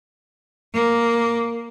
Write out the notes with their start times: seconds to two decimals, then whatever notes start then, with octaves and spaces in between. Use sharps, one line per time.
0.74 A#3